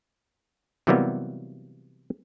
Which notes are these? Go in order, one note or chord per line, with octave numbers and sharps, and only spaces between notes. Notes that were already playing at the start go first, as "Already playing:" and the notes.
C3 E3 F#3 G3 A#3 B3